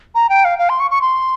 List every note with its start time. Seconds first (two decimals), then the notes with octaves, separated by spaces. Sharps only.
0.15 A#5
0.30 G5
0.45 F5
0.59 F5
0.69 C6
0.80 C#6
0.91 C#6
1.02 C6